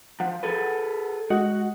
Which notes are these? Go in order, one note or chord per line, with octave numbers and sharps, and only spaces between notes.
F3 F#5
G#4 A4 B4
G#3 F#4 D#5 F#5